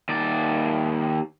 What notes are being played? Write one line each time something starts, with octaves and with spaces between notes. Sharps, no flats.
D#2 D5